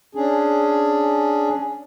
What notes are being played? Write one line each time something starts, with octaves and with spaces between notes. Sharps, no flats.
C#4 D4 G#4